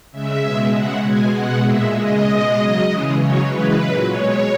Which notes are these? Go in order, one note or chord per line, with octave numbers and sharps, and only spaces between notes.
C#3 G#3 E5
B2 G#3
C#3 G#3 F#5
B2 G#3 G#5
B2 G#3 F#5
A#2 G#3 E5
C#3 G#3 D#5
B2 G#3
C#3 F#3
C#3 E3 G#3
C#3 F#3 C#5
C#3 E3 G#3 B4
A#2 F#3
B2 G#3 C#5